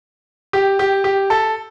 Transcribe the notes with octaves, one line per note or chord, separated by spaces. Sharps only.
G4
G4
G4
A4